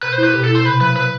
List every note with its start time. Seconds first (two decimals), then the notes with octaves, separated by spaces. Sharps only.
0.03 B2 B4
0.12 C5
0.18 E4
0.24 B4
0.33 B2 G4
0.44 A4
0.49 E4
0.55 C5
0.65 C3 B4
0.81 F#3 B4
0.96 F#3 B4